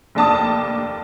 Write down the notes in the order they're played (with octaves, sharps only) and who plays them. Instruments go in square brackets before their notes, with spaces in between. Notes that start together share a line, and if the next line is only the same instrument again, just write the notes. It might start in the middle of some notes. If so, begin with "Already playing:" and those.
[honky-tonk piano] F1 D#2 D4 A5 D6 D#6